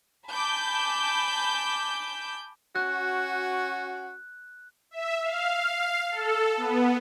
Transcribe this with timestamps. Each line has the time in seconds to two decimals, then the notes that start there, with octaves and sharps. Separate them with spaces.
0.30 G#5 A5 B5 D6 G6
2.76 C#4 F#4 F#6
4.91 E5
5.23 F5
6.11 A4
6.57 B3